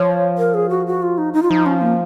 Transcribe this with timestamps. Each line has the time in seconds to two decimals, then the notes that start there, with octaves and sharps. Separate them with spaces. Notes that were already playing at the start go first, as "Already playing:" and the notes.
Already playing: F3 C#5
0.38 A#4
0.54 G#4
0.70 F#4
0.87 F#4
1.03 F4
1.18 D#4
1.34 D#4
1.42 F4
1.50 F3 D#4
1.66 C#4
1.81 A#3